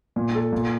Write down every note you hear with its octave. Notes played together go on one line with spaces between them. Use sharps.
A#2
A4
A#2